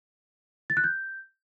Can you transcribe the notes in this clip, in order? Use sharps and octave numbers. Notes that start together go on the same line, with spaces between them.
A6
F#6
G6